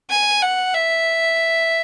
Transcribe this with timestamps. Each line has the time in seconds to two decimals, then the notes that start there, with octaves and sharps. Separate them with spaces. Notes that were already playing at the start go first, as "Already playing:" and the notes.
0.10 G#5
0.42 F#5
0.75 E5